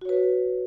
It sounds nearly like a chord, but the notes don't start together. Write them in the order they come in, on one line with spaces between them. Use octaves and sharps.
F#4 C#5 B4